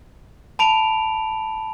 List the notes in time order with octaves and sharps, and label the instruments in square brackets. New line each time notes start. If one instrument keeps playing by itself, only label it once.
[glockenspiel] A5 B5 D7 F7